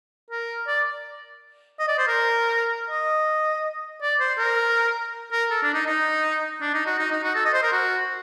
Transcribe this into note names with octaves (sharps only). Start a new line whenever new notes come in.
A#4
D5
D#5
D5
C5
A#4
D#5
D5
C5
A#4
A#4
A4
D4
D#4
D#4
D4
D#4
F#4
D#4
D#4
F#4
A4
D#5
C5
A#4
F#4